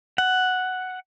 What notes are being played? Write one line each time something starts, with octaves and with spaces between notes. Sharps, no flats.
F#5